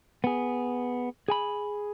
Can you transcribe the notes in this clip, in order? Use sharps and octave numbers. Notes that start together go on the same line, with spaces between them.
B3 G#4
G#4 G#5 B5